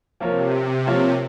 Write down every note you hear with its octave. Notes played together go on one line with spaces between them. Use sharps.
C3 F3 A#3 F4 A#4 C#5
F3 A#3 F4 A#4 C#5